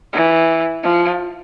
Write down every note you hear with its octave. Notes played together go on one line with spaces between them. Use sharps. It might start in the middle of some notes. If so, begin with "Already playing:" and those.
E3
F3